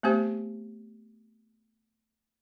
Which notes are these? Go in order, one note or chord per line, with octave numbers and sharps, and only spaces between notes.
A3 B3 C4 G4 C5